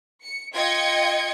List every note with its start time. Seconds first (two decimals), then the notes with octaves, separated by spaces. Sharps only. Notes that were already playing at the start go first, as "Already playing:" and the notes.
0.22 C#7
0.53 F4 D#5 G5 G#6 C#7